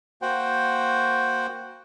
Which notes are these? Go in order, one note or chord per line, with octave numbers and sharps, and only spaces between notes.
A#3 F#4 C5 F#5 G5